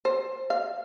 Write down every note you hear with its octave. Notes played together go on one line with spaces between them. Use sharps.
C5
F5